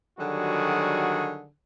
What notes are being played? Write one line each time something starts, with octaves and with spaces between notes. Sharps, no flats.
D3 D#3 F#3 G3 F#4 G#4